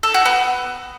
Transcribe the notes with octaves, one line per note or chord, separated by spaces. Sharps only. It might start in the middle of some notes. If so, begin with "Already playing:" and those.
A4
F#4
B3